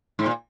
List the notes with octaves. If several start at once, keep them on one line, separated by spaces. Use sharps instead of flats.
G#2
A#2